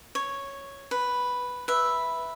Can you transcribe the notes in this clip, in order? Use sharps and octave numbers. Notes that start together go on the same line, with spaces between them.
C#5
B4
B4 E5